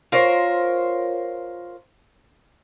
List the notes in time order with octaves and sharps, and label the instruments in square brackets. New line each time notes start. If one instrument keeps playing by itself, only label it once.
[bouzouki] F4 A#4 C5 C#5